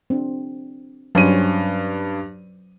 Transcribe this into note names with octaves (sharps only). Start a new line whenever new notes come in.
C4 D4
G2 F#3 C#4 C5 D#7